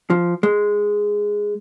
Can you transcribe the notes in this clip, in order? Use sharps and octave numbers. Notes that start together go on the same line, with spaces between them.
F3
G#3